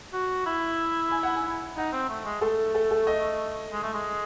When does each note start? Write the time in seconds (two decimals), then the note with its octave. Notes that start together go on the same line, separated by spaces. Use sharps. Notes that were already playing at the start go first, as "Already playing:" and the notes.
0.14 F#4
0.46 E4
1.11 G#5
1.23 F#5
1.36 G#5
1.77 D#4 F#5
1.93 C4
2.09 A3
2.25 G#3
2.41 A3 A4
2.75 A4
2.91 A4
3.07 D#5
3.72 G#3
3.83 A3
3.94 G#3